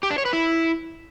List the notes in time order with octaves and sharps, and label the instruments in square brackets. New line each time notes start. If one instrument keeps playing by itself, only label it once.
[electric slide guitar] G4
D4
C#5
B4
E4